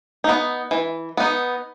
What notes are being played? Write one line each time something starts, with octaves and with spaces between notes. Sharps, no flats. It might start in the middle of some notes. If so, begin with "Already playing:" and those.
B3 D#4
E3
B3 D#4